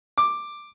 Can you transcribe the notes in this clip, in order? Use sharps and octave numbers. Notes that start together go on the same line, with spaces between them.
D6